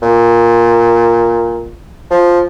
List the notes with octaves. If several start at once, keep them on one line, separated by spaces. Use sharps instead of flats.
A#2
F3